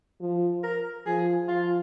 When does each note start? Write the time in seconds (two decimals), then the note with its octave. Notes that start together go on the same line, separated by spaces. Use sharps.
0.20 F3
0.63 A#4
1.06 F3 G#4
1.48 F3 F4